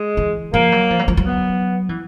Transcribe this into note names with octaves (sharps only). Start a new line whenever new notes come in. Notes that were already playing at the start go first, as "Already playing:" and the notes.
Already playing: G#3
E3
F3 A#3
F#3
F3
F#3
F3
F#3
B3
E3